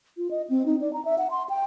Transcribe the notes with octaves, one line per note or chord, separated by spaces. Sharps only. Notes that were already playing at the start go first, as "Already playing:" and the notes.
F4
D#5
C4
D#4
D5
A#5
E5
F#5
C6
G5